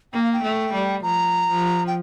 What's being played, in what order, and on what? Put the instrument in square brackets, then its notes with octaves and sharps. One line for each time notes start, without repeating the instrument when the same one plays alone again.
[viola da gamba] A#3 [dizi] G5
[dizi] F5
G5
[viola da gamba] A3
G3
[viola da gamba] F3 [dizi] A#5
[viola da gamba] F3
[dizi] G5